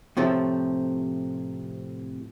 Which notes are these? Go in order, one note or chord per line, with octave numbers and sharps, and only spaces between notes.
A2 C3 F3 A3